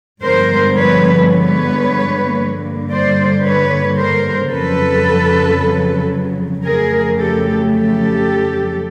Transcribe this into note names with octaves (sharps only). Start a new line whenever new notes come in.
G2 D3 F3 G#3 B3 A#4 C5
B4 C#5
B4 C#5
G2 D3 G3 A#3
C5 D5
B4 C#5
A#4 C5
F2 C#3 F#3 A4 B4
F2 C#3 F#3 A3 G#4 A#4
G4 A4
G4 A4